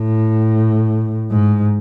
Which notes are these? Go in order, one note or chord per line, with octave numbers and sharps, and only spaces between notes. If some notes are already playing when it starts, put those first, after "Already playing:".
Already playing: A2
G#2